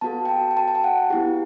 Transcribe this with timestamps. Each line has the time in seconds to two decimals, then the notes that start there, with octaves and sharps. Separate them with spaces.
0.01 B3 F#4 A4 A5
0.25 G5
0.29 A5
0.51 G5
0.57 A5
0.68 A5
0.75 G5
0.84 F#5
1.10 B3 E4 G4